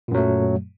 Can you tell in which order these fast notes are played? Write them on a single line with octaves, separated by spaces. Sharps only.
A#2 F#2 F#3 A3